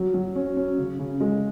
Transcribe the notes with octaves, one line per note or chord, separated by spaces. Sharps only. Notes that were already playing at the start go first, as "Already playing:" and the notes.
Already playing: F#3
F#3
C#4
C#4
C#3
C#3
G#3